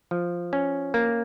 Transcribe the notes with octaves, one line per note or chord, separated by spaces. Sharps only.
F3
C#4
A#3